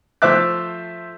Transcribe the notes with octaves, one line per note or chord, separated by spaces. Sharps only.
F3 A3 C5 E5 D6 F#6